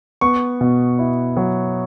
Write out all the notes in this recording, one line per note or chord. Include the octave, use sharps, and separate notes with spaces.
B3 C#6
B2
E4
F#3